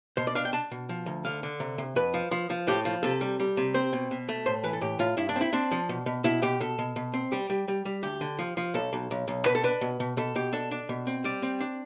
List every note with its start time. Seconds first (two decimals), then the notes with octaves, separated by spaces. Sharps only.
0.17 B2 C5
0.27 D5
0.35 D4 F5
0.45 G5
0.53 D4 A5
0.72 B2
0.89 F3
1.06 D2
1.25 D3 F5
1.43 D3
1.60 C3
1.78 C3
1.96 F2 B4
2.14 F3
2.31 F3
2.50 F3
2.67 A2 G4
2.85 F3
3.03 C3 A4
3.21 G3
3.40 G3
3.57 C3
3.74 C4 C5
3.93 B2
4.11 B2
4.29 A3
4.46 A2 C5
4.64 E3 B4
4.73 A4
4.81 A2 G4
4.99 A2 F4
5.17 G2 E4
5.29 D4
5.36 C4
5.41 E4
5.53 C4 D4
5.71 F3
5.89 B2
6.06 B2
6.24 B2 E4
6.42 B2 G4
6.60 B2 A4
6.79 B2
6.96 B2
7.14 C4
7.32 G3 G4
7.50 G3
7.68 G3
7.85 G3
8.03 D2 G4
8.21 D3
8.39 F3
8.57 F3
8.74 B1 A4
8.93 B1
9.11 B1
9.28 B1
9.45 B2 B4
9.55 A4
9.64 D4 B4
9.81 B2
10.00 B2
10.17 B2 A4
10.36 B2 G4
10.53 D4 A4
10.71 D4
10.89 B2
11.07 C4
11.24 G3 D5
11.42 C4
11.60 D4